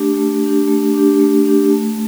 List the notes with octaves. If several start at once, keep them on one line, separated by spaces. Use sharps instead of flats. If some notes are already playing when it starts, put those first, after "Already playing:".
Already playing: A3 D4 G4
A3
D4 G4
A3
D4 G4
A3
D4 G4
A3